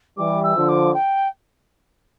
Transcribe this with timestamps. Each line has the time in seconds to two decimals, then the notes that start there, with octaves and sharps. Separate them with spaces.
0.18 E3 G3 D6
0.44 E6
0.56 D3 F3
0.69 D6
0.94 G5